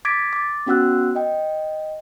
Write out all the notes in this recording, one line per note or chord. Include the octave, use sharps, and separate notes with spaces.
D6 G#6 A6 B6 D7
D6 A6
B3 C#4 F#4 F#5 E6 F#6
D#5 G5